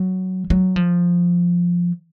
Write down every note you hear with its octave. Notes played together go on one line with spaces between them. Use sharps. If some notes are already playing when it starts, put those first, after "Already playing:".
Already playing: F#3
F#3
F3